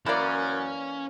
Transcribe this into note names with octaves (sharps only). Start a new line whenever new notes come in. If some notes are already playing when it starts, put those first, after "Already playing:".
F#2 E3 A#3 C#4 E4 D5